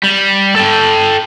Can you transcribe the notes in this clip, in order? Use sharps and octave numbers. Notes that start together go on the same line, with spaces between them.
G3
A4 G5